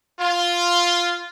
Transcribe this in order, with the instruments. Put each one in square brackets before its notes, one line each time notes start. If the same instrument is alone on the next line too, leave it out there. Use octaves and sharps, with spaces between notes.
[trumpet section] F4